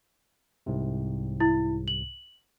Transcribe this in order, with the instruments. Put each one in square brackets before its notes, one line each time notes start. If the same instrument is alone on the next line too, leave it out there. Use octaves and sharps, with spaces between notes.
[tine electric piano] C2 G#2 C3
[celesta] E4
F#7